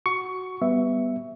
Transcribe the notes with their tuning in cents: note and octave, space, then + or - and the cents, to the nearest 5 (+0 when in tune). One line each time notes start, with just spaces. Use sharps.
F#4 +0 C#6 +15
G3 +0 B3 +0 E5 +0